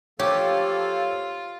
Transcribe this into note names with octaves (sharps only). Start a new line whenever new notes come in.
F3 A#3 F4 G4 A4 C#5